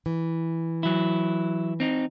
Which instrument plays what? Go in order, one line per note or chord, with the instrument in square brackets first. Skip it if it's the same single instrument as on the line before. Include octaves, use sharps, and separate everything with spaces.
[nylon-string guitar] E3
[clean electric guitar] F#3 E4
C4 D#4